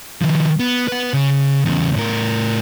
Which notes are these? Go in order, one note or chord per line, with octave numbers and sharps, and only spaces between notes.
D#3 F3
B3
B4 F#5
C#3
E2 C#3
A2 A#4